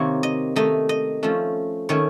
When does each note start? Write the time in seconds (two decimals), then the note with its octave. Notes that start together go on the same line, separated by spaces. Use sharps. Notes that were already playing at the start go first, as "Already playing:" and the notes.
Already playing: C3 D#3 A#3 F#4 A#4 C#5
0.23 D#5
0.56 D#3 A3 D#4 D#5
0.89 D#5
1.23 F3 A3 C#4
1.89 D#3 A3 C#4 C#5